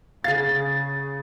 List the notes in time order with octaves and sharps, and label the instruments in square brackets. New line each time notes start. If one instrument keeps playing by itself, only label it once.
[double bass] C#3 [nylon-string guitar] G#4 F5 [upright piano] A6